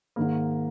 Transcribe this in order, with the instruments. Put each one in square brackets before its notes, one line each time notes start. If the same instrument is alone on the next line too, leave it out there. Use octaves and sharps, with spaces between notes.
[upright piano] G#2 D#3 A#3